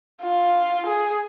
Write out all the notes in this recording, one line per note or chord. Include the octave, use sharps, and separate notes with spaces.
F4
G#4